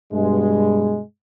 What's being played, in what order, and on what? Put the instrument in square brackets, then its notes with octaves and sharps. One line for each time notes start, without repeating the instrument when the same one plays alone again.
[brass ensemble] G2 B2 G#3